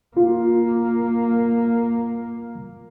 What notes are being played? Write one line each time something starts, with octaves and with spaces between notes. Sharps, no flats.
A#3 F4